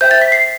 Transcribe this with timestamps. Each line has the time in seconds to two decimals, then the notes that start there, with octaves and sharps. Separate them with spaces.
0.01 C5 E5 G5 G6
0.11 A6
0.22 B6
0.32 C7